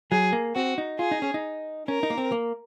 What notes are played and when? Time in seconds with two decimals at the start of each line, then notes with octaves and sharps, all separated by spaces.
0.11 F#3 G#4
0.33 A#3
0.55 C4 F#4
0.78 D#4
0.99 F4 G#4
1.11 D#4
1.22 C#4
1.34 D#4
1.88 C#4 A#4
2.03 D#4
2.10 A#3
2.17 C4
2.32 A#3